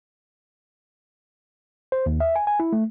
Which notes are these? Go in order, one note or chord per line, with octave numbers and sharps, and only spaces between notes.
C5
D#2
E5
G#5
G#5
E4
A3